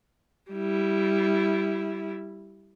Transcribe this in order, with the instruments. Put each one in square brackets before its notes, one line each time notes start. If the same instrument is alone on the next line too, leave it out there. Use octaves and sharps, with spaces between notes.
[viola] G3 E4